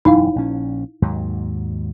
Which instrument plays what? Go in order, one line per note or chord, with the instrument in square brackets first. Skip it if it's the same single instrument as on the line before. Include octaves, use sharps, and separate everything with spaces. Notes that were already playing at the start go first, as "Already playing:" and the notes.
[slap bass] E1 F#2 [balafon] D#4 E4 F5
[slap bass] A#1 C#4
D#2 G#2 F#3